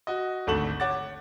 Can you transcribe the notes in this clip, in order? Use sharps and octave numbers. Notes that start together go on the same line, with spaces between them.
F#4 D#5
G#1 D2 A3 A4 E7 F#7
C#5 F#5 D6 A6